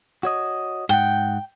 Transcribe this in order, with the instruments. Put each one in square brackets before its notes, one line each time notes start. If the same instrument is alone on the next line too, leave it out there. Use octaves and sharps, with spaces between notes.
[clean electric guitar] F#4 C#5 D#5
[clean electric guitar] G#2 F#5 [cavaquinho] G5